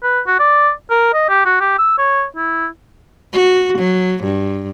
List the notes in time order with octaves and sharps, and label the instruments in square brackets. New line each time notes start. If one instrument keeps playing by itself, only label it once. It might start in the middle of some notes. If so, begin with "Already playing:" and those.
[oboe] B4
F#4
D5
A#4
D#5
G4
F#4
G4
E6
C#5
E4
[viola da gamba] F#4
F#3
G2